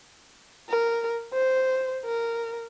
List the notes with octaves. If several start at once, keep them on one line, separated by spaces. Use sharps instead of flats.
A#4
C5
A#4